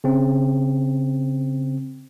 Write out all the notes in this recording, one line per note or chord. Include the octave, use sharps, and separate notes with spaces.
C#3 C4